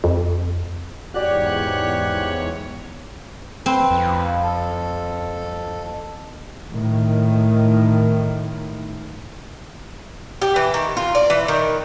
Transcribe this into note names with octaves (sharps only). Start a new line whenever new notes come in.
F2
E2 G#2 F#4 G4 C#5 D5 F#6
C4 B4
F2
A4
A2 D#3
G4
E3
D#3
F4
D5
E3
D#3